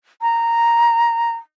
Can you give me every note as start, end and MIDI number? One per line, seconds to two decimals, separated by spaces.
0.22 1.32 82